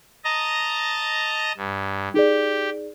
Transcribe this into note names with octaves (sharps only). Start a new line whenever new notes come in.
D#5 A5 A#5
G2
D#4 G4 G#4 D5